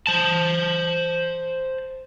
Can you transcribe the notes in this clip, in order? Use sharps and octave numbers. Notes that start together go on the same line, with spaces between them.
C5 A5